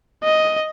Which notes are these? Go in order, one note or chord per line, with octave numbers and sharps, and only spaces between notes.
D#5